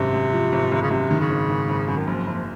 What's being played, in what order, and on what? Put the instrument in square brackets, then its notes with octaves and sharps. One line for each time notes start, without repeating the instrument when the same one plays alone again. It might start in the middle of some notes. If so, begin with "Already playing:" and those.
Already playing: [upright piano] G#1 F#2 [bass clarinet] C3
[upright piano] F#2
F3
G#1
G#1
[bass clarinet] C#3
[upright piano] F#2 [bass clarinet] C3
[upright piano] D#3
[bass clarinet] C#3
[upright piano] G#1
G#1
G#1
F#2
[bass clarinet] D#3
[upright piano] F#1 [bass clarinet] F3
[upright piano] F#1 [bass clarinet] F3